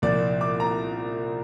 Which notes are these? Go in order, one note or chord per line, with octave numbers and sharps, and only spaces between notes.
C2 A#2 F3 D5
D6
A#5